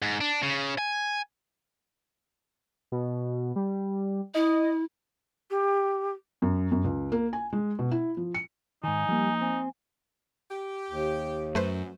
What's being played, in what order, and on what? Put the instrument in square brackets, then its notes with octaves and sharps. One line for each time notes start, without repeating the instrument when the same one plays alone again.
[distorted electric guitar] G#2
D4
C#3
G#5
[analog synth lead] B2
G3
[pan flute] E4 [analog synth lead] D#5
[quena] G4
[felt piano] F#2
F#2
C#2
A#3
G#5
G#3
B2
E4
F3
C#7
[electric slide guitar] G#2 D#3 [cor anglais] D#4 [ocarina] G#5
[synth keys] F3 A#3 [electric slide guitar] G3
[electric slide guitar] C4 [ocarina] G#5
[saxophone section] G4
[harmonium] D#2
[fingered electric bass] F#2 [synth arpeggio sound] A3 B4 C5